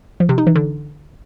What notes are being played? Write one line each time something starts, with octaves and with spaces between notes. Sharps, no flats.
F3
C3
D#4
E3
D3